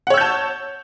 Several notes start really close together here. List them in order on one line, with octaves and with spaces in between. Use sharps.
F#5 C#5 E6 G6 A5